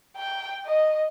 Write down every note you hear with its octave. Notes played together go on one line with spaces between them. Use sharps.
G5
D#5